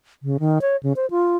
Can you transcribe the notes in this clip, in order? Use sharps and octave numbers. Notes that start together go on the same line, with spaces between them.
C#3
D#3
C#5
C#3
C5
F4